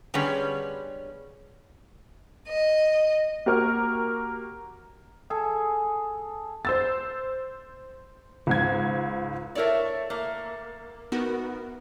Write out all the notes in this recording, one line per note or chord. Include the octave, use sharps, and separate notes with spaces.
D3 G3 B3 C#4 G#4
D#5
A#3 F#4 G4 A#4
G#4 A4
C5 E6 A6
C#2 G#2 G#6
A3 E4 A#4 C#5 D5
A3 A#3
B3 D#4 F#4 A#4